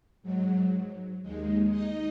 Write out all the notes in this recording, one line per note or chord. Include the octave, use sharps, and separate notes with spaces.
G#2 F#3
D#2 D#3 G#3
D#4 D#5